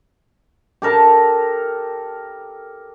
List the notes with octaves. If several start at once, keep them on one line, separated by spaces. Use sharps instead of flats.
G4 A4 A#4 A5